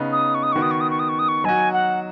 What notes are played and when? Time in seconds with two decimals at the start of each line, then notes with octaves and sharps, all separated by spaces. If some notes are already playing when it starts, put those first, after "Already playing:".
Already playing: C#3 B3 D#4
0.12 D#6
0.35 C#6
0.43 D#6
0.52 D#3 B3 F#4 C#6
0.62 D#6
0.71 C#6
0.81 D#6
0.90 C#6
0.99 D#6
1.09 C#6
1.19 D#6
1.28 C#6
1.44 F#3 D#4 F#4 G#5
1.73 F#5